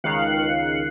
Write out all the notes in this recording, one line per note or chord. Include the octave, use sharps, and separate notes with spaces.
C#2 D#3 F5 F#6 C7 C#7